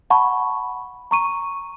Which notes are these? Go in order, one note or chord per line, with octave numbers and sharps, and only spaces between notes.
F#5 A5 B5 C#6
A#5 C#6 D#7